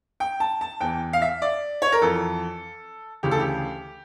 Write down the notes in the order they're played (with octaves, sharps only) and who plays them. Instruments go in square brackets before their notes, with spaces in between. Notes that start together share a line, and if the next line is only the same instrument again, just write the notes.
[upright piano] G5
A5
A5
E2 E3 G5
F5
E5
D5
C#5
A#4
F2 E3 A4
D2 C#3 E3 G4
A4
G4